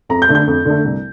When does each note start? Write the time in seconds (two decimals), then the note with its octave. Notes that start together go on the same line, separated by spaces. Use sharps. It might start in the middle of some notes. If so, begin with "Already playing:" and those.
0.09 F2 A#5
0.22 G6
0.29 D3 A3
0.35 G6
0.47 F2
0.65 D3 A3
0.84 C2